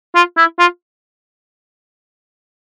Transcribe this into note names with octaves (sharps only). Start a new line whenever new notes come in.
F4
E4
F4